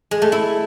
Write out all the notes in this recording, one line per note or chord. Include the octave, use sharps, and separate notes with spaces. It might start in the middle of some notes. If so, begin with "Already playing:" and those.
G#3
A3
E4